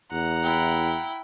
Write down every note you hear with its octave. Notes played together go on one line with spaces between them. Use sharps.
E2 F#5 A#5
E4 G5